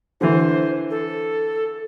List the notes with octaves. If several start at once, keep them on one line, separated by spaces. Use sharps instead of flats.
D3 E3 C5
A4